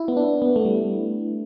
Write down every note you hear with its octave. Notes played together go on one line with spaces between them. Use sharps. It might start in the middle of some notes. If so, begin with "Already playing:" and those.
Already playing: E4
B3
D4
B3
A3
G3